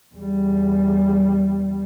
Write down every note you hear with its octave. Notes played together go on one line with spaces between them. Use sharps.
E2 G3